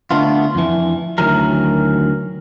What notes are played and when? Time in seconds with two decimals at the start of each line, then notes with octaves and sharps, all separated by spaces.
0.11 D3 A3 B3 F4
0.55 F2 E3
1.18 D2 D#3 E3 F#3 A#4